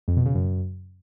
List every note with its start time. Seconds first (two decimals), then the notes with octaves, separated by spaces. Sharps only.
0.08 F2
0.17 B2
0.26 C#3
0.35 F#2